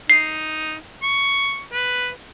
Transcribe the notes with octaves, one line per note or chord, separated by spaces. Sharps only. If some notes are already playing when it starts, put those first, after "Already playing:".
D#4 C7
C#6
B4